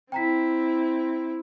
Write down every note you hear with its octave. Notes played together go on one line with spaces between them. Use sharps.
C4 E4 G5 A#5 B6